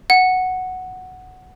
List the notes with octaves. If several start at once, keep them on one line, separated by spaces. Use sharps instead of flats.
F#5